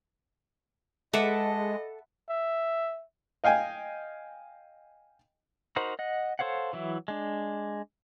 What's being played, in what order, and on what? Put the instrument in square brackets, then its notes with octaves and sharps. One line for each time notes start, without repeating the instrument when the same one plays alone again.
[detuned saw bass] G#3 [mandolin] A4 A5 D6 [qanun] B4 E5 F#5 [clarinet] D#5
[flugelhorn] E5
[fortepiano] D#5 F5 G5 G#5
[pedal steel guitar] D#4 F#4 A#4 C5 B5
D#5 F#5
A4 C5 C#5 F5 F#5
E3 F#3 E4
G#3 D4